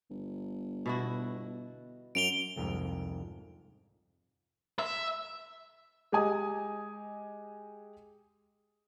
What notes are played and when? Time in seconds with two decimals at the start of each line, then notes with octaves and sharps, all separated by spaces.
0.10 G1
0.86 B2 E4 F#4
2.15 F#2 D7 F7 G7
2.56 C2 F2 G#2
4.79 E5
6.12 G#3 G4 D#5 G#5 D#6